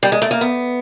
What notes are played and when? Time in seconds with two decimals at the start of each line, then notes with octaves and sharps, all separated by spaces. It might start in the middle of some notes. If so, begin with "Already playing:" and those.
0.03 G3
0.12 G#3
0.22 A3
0.31 A#3
0.41 B3